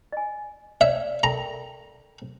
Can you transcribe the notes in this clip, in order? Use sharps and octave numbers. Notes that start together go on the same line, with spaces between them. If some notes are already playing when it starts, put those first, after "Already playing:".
D#5 G#5
C#5 D5 E5
A4 A#4 G5 A#5